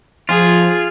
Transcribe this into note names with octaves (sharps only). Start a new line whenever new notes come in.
F3 F4 G#4